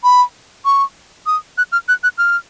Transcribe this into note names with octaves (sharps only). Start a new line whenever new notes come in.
B5
C#6
D#6
F#6
F6
F#6
F#6
F6